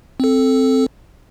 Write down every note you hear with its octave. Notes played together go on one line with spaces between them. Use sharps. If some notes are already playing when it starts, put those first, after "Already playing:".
C4 A4